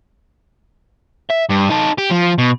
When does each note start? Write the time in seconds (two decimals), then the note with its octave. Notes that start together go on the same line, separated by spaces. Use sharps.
1.30 E5
1.50 G2
1.70 D#4 A4
1.98 G4
2.11 F3
2.38 B2